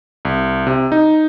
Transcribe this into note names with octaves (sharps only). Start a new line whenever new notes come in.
C2
C3
D#4